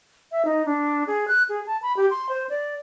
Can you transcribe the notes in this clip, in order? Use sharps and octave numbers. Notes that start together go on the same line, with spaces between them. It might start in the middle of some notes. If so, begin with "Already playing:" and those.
E5
D#4
D4
G#4
F#6
G#4
A5
B5
G4
C6
C5
D5